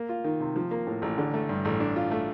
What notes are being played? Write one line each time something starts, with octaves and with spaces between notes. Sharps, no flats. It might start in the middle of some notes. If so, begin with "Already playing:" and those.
Already playing: A#3
F4
D#3
C3
F3
A#3
A2
A1
D3
A3
G2
A1
D4
F4
A3